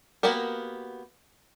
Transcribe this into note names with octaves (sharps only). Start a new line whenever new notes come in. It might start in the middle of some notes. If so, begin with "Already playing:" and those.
A#3 B3 F#4 G4 A#4